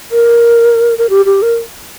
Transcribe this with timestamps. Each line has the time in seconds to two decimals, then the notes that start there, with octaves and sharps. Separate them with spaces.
0.12 A#4
0.98 A#4
1.10 G4
1.25 G4
1.42 A#4